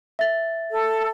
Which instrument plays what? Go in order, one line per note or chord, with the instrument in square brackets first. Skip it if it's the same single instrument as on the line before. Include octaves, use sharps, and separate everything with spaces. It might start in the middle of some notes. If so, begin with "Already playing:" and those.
[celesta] E5 A6
[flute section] A4